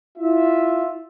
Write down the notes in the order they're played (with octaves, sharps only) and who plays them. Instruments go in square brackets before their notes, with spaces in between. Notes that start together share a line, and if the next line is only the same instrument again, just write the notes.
[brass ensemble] E4 F4 E5